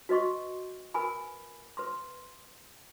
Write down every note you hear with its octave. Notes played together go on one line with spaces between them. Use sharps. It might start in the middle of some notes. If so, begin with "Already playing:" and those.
F#4 B4 D#5 C6 C#6
A#4 B4 G#5 B5
B4 C6